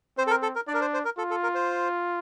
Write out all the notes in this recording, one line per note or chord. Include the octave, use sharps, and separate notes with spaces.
C4 C5
A4
A#4
A4
A#4
D4 D5
A#4
C5
C5
A#4
F4 A4
A4
A#4
C5